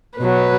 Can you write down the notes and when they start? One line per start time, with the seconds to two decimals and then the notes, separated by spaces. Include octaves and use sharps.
0.19 B2 F#3 B4